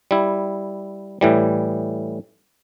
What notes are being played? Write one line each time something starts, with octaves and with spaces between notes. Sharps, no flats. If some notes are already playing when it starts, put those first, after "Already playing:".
G3 E4
A2 E3 G3